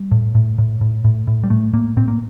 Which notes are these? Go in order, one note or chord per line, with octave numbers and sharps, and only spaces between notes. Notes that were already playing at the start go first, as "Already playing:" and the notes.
Already playing: G3
A2
A2
A2
A2
A2
A2
G3
A2 A3
A2 A#3
A2 C4
A#3